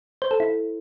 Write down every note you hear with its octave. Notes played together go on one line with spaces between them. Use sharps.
C5
A4
E4